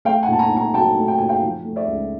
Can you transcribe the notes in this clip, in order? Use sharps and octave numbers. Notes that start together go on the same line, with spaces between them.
A3 F5 G5
F#5 G#5
A#2 A5
G#5 A#5
A#2
G#5 A#5
F#3 G5 A5
A3
G5
A#2 G#5
F5 G5
F3
A3
D5 E5
C#2